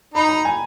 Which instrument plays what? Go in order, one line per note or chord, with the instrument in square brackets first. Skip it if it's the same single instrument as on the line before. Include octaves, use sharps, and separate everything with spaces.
[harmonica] D#4 [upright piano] B5
[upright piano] A#5
G#5